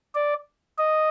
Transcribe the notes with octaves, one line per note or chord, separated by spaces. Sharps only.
D5
D#5